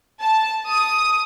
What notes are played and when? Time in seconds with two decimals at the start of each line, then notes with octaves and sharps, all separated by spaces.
0.22 A5
0.68 D#6